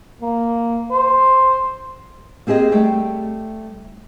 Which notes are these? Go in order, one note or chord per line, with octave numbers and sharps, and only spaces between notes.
A#3
C5
A#3 C4 G4 G#4 D#5
G3 A3 G5